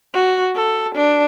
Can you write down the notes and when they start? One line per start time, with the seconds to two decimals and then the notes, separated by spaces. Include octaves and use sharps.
0.14 F#4
0.56 A4
0.95 D4